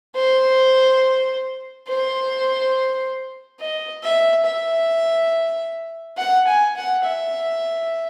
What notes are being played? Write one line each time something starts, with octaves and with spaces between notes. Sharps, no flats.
C5
C5
D#5
E5
E5
F#5
G#5
F#5
E5